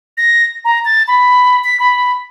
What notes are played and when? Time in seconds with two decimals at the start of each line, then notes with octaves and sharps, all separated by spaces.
0.17 A#6
0.65 A#5
0.85 A6
1.08 B5
1.64 B6
1.80 B5